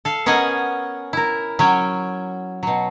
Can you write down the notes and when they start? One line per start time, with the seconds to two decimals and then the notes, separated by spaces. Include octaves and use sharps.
0.05 A4 F5
0.26 B3 C#4 A#4 D#5 F#5 G#5
1.13 E4 A#4
1.59 F#3 C#4 G5
2.63 B2 F#3